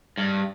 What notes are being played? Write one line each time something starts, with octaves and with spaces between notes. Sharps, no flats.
G2